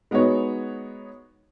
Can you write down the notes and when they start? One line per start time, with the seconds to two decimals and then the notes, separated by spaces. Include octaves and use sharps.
0.11 G#3 B3 D#4 F#4 C#5